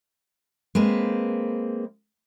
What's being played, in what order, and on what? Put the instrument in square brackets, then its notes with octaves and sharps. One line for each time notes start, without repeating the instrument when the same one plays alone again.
[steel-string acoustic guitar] G#3 A#3 C4 B4